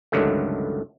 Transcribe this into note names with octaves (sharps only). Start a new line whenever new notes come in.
C#2 G2 D3 D#3 F#3 A3